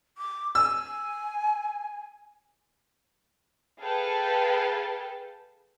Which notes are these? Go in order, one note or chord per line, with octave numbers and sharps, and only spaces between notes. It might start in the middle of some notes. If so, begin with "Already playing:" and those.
D6
G#5 E6
G#4 A4 B4 F5 G5 A5